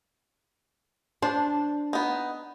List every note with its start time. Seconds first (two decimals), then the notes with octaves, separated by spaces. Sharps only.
1.22 D4 C5
1.93 B3 D#4